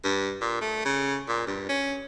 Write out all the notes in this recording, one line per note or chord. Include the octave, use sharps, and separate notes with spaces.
G2
A#2
A3
C#3
A#2
G2
C#4